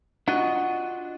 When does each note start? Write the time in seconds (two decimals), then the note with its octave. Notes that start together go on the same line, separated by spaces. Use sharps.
0.28 D4 F4 F#4 D#5